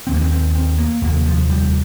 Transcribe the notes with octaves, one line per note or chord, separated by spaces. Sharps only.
F1 C4
D#2 A#3
C4
C4
C4
A#3
F1 D#2 A#3
F3
G3